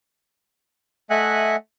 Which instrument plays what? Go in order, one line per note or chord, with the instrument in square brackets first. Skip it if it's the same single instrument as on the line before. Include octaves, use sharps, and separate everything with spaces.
[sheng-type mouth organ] A3 D#5 E5 F#5 G#5 F#6